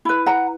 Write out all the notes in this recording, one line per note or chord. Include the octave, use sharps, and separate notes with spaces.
E4 B4
F#5 A#5